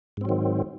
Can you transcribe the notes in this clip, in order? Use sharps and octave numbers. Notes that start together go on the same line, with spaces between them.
G#2 D#3 F#3 C4